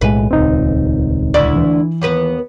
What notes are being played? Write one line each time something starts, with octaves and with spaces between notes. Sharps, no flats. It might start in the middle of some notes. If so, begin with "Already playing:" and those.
B1 A2 G#3 B4
D#1 C#2 C4 D#4
D2 E4 D5
E3
D#2 B3 B4